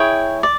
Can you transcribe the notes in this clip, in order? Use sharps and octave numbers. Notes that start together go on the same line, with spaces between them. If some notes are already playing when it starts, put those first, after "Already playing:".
Already playing: E4 G#4 C#5 G5
D5